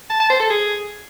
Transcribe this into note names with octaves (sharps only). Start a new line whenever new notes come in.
A5
A5
C5
A4
G#4